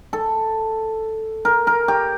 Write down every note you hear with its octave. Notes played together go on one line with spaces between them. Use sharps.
A4
A#4
A#4
G4